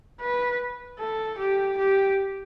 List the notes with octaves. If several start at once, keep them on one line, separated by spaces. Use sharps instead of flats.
B4
A4
G4
G4